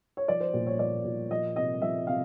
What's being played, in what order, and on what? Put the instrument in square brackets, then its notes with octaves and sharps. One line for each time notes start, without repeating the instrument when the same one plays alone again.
[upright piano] C#5
F3 D5
C5
A#2
C#5
F3 D5
A#2
F3 D#5
C3 D#5
F3 E5
C3 F5